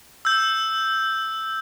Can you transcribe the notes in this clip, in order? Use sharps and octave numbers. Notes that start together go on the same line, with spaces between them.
E6 G6